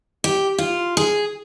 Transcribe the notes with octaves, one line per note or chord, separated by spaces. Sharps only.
G4
F4
G#4